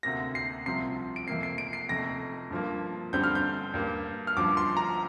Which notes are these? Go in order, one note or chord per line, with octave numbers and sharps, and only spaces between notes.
D2 C3 A#3 A#6
C7
C2 C3 F3 C4 C7
D7
F2 C3 A#3 C7
C7
D7
C7
F1 F2 C3 A#6
G2 F3 A#3
G2 D3 G3 C4 G6
F6
G6
G2 G3 A#3
F6
G1 G2 F3 D6
C6
A#5